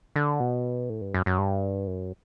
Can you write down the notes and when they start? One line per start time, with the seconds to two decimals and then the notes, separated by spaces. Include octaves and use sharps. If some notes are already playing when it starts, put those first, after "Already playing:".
0.16 D3
0.40 B2
0.90 A2
1.01 G2
1.14 F#2
1.26 F#2
1.38 G2
1.87 F#2